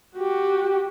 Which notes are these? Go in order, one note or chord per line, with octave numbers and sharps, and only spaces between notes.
F#4 G4